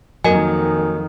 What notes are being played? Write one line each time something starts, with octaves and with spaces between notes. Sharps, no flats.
F2 D#3 F#3 A#3 A#4 D#5 G#5